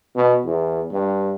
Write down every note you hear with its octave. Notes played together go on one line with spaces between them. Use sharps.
B2
E2
G2